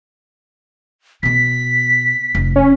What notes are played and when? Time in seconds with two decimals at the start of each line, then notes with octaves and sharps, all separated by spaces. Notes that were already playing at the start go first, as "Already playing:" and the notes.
1.23 B2 B3 B6
2.35 F1
2.56 C#4